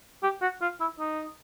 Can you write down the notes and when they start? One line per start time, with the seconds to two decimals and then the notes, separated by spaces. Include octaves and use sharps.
0.23 G4
0.42 F#4
0.62 F4
0.80 E4
0.99 D#4